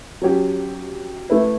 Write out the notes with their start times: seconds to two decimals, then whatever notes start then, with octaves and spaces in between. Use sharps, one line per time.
0.22 F#3 C#4 G4
1.30 A3 E4 B4